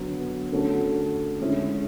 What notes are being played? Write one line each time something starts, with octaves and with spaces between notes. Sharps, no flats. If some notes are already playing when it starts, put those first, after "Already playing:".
Already playing: D3 F#3 B3
D3 A3 C#4 F#4 A4
D3 G#3 C#4 E4 G#4